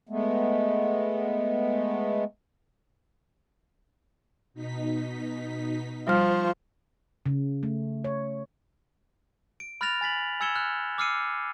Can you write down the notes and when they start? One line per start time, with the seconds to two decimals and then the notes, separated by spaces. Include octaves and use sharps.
0.09 G#3 A3 B3
4.54 B2 D#4 B6
6.08 F3 G3 F4 C5 C#6 F6
7.26 C#3
7.63 A3
8.04 C#5
9.60 D7
9.81 B5 F6 F#6 A6 A#6 F7
10.01 G#5 A6 B6 F#7
10.40 G#5 E6 G#6 C#7 E7 G7
10.55 F6 F#6
10.98 D6 E6 F6 C7 C#7 D#7